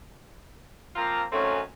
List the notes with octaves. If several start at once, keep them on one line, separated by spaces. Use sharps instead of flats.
F3 A#3 C4 F4 F5 A#5
D#3 F#3 A3 C4 C#4